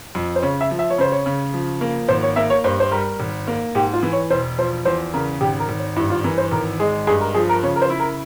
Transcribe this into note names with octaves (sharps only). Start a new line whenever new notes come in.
F2
C5
C#3 C#5
E5
F3
E5
C#5
C#3 C5
C#5
C#3
F3
A#3
G#1 C5
C#5
A#3 E5
C#5
G2 C5
C5
G3 A#4
G#1
A#3
G#2 G4
F4
E3
C#5
E1 C5
F3 C5
E2 C5
C#3 A#4
G#1 G4
A#4
G#1
C#5
G2 E4
F4
E3 A#4
C5
G#1 A#4
G#3 G#4
G2 G#4
A#4
F3 G#4
A#4
C#3 C#5
A#4
C5
E4
A#4